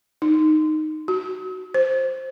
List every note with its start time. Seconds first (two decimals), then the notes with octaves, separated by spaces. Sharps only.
0.22 D#4
1.08 F#4
1.74 C5